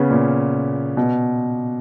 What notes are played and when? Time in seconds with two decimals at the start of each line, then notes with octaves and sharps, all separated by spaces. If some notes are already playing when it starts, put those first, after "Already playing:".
Already playing: C#3 B3 C#4
0.10 A#2
0.97 B2